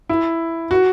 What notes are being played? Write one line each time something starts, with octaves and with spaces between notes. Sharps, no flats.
E4
F#4